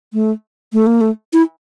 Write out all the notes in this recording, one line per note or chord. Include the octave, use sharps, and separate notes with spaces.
A3
A3
A#3
A3
E4